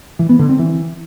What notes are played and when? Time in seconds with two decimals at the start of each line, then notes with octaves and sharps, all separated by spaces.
0.19 E3
0.29 B3
0.39 D3
0.49 C4
0.59 E3